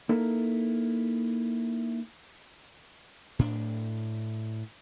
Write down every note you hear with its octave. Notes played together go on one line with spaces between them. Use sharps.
A#3 D#4 E4 A4 A#4
A2 D4